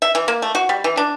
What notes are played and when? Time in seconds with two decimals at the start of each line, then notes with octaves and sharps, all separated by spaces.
0.02 E5
0.15 E3
0.28 A#3
0.42 A3
0.55 F#4
0.69 G3
0.84 E3
0.97 D4